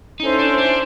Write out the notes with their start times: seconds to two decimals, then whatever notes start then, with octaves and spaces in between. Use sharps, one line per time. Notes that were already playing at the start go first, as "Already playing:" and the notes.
0.20 C#4 D#4 E4 A4 C5
0.39 D4
0.58 D4